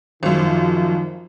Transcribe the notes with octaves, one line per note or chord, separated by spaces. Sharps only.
G#1 F#2 D#3 F3